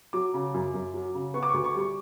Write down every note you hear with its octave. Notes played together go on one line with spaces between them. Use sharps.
F#3 D6
C#3
F#2
F#2
F#3
C#3
B3 C#6
D6
D2 C#6
C#6
G3 C#6